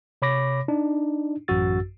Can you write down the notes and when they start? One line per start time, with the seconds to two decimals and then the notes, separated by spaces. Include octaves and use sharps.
0.22 C3 C#5 B5 D6 A#6
0.68 D4 D#4
1.48 A1 F#2 F#4 E6 A6